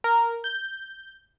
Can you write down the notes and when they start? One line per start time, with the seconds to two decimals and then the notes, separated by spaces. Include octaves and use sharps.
0.04 A#4
0.44 G6